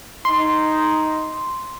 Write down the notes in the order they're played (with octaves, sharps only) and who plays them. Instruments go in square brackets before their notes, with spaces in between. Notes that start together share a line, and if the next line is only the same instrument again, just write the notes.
[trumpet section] D#4 [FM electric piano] C6